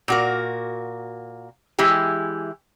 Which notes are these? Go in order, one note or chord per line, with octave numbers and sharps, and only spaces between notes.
A#2 F#4 A#4
E3 G#3 E4 G4